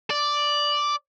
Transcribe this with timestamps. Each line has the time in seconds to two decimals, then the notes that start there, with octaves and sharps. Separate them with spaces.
0.10 D5